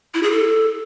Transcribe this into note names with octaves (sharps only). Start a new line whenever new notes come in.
E4
G#4
A4